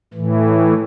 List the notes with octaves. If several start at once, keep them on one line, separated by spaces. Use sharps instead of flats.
A2 E3